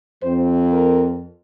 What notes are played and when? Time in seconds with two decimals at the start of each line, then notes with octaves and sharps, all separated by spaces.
0.23 F2 F3 C4 C5
0.73 A#4